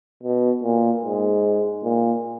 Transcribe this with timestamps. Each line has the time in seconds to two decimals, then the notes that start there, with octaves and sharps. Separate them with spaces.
0.23 B2
0.63 A#2
1.04 G#2
1.84 A#2